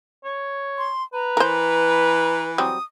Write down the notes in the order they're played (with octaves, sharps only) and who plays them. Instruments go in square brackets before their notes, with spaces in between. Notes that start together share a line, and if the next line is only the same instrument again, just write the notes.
[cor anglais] C#5
[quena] C6
[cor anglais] B4 [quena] A#5
[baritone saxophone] E3 [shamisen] A#4 C5
[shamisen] F#3 G3 C4 [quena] D#6